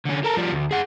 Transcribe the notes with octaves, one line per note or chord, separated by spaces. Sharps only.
D3 C#4
A4 A#4
F3 G3
D2
G#4 F#5